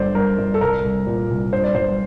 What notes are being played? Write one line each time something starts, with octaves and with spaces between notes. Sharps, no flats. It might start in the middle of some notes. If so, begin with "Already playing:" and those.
Already playing: G1 D3 C5 D5
G2 A#4
G1
A4
C2 A#4
C2
A#2
C2
G2 C5
D5
G1 C5